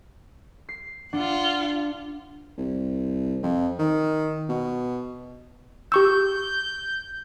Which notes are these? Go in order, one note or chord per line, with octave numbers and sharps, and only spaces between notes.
C7
D4 F4 F#5
C2
F2
D#3
B2
G4 C#6 E6 G6